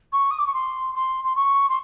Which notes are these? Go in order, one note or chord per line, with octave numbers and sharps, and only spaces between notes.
C#6
D#6
D6
C#6
C6
C6
C6
C#6
C6